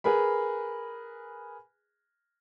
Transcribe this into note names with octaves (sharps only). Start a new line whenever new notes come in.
G#4 A#4 B4 B5